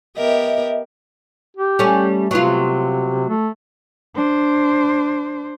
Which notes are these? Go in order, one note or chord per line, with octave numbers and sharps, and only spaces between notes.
B3 G4 A#4 D#5 E5
G4
G3 A3 C#4
C3 F#3 B3 F4
A3
D4 C5